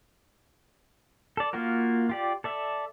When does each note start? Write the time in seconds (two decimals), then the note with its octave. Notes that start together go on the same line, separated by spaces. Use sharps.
1.37 A4 D5
1.53 A#3 F4 F#4 A#4
2.09 F4 G4 D5
2.44 A4 D5 E5